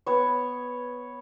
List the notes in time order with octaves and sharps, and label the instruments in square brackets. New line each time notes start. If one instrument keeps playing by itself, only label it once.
[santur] B3 C#5